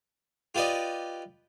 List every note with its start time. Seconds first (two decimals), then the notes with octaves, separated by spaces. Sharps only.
0.55 F4 G4 B4 D5 D#5